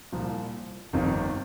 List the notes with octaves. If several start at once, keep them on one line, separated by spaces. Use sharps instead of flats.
C2 A#2 F3
G1 F2 C3 D#3